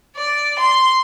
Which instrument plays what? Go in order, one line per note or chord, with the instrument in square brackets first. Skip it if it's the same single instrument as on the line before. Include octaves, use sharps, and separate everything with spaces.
[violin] D5
C6